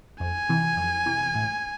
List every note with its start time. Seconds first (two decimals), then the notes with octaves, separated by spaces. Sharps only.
0.20 F2 G#5
0.49 C3 E3
0.77 F2
1.06 C3 E3
1.35 A2